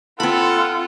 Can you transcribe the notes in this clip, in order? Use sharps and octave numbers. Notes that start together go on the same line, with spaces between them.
C4 F4 A4 F#5 B5